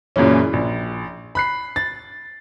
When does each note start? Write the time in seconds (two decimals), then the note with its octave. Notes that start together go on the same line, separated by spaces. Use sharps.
0.16 F#2 A#2 C#3 E3 C#4
0.53 A#1
1.35 B5 F#6 C7
1.76 A6